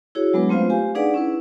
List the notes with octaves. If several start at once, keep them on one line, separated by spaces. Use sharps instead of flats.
E4 F#4 G#4 C#5
F#3 G#3 B3 D4 B4
A3 C4 F4 C5 F5
G4 F5 G#5
D4 D#4 G#4 B4 D5 F#5
C#4 E4 B4